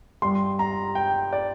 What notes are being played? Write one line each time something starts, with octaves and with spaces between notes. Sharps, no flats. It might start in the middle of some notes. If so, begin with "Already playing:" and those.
G2 G3 C6
A#5
G5
D5